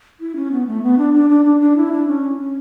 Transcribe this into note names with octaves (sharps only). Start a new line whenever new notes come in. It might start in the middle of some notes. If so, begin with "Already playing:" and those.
E4
C#4
B3
A3
B3
D4
D4
D4
D4
D4
E4
D4
C#4
C#4